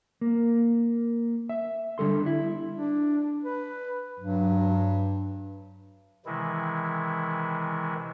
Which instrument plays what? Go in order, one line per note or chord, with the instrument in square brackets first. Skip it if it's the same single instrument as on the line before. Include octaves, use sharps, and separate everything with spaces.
[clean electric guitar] A#3
E5
D3 G3 A4 C6
E4
[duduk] D4
B4
[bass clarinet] G2 [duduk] F#3
[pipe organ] C3 D#3 E3 G#3 E4